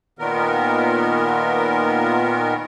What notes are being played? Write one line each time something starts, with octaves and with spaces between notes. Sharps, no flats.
A#2 D#3 B3 A#4